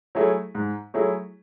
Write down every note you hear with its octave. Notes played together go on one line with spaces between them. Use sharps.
F#3 A3 E4 G#4
G#2
F#3 A3 E4 G#4